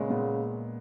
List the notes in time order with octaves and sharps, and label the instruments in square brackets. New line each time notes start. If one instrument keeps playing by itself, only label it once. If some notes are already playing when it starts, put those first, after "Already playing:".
Already playing: [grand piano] A#2 G#3 B3 [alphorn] C#3
[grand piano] A#2 G#3 B3